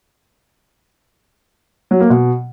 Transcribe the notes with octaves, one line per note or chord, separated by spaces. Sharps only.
F#3
A#3
B2